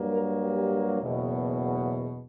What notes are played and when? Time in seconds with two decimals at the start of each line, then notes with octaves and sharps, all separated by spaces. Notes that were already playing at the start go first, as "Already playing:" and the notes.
Already playing: G2 F#3 A#3
0.09 A#4
0.39 G4
0.99 F#1 E2 B2